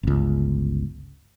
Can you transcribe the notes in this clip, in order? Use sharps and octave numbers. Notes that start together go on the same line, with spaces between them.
G1 C#2